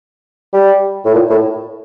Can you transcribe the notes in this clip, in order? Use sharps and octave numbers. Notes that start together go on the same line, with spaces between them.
G3
A2
A#2
A2